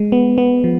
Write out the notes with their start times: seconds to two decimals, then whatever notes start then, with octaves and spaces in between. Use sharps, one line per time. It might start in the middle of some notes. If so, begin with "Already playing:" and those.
Already playing: G#3
0.12 B3
0.38 B3
0.64 F3